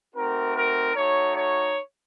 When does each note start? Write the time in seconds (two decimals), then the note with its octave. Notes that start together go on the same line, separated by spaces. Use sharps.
0.14 A3 C4 D#4 F#4 A#4
0.56 A#4
0.95 A3 D#4 F#4 C#5
1.36 C#5